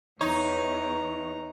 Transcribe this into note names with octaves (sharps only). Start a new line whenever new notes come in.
E2 D#4 B4 C#5 A#5